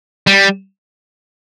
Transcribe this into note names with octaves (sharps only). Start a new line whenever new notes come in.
G3